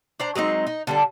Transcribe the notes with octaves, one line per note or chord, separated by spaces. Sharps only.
D4 C5 A#5
F#3 G#3 C4 D#4
D#4
D3 G3 D4 A4